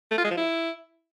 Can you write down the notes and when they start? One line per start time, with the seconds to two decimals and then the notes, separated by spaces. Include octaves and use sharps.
0.11 A3
0.18 F4
0.24 G#3
0.31 F3
0.37 E4